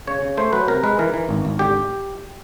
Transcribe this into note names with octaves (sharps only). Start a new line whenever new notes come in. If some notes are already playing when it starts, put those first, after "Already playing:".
C#3 C#5
C#3
A3 C5
F#3 B4
C3 A#4
G#3 B4
E3 A#4
E3
G#1
G#1
D3 G4